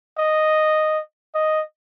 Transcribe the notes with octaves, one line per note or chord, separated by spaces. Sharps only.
D#5
D#5